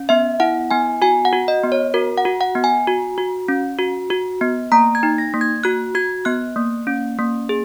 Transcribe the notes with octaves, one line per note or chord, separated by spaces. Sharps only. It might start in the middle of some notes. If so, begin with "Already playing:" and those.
Already playing: C#4
B3 E5
E4 F#5
B3 G#5
F#4 G#5
F#5
F#4
D#5
B3
C#5
F#4 A#4
F#5
F#4
F#5
B3
G#5
F#4
F#4
C#4
F#4
F#4
B3
A#3 A#5
G#6
D#4
A#6
A#3
G#6
F#4 F#6
F#4 G#6
B3 F#6
A#3
C#4
A#3
G#4